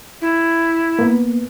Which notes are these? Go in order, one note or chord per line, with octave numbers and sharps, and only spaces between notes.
E4
A#3 B3